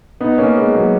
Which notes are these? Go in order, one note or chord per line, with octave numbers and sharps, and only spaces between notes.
B3 D#4
A#3 C#4
G#3 B3
F#3 A#3